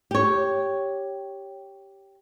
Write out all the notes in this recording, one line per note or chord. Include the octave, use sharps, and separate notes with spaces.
G4 C#5